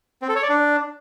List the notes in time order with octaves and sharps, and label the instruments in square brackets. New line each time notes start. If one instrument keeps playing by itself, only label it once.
[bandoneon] C4
A4
C#5
D5
D4